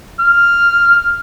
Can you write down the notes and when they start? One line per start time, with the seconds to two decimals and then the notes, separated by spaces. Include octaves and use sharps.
0.21 F6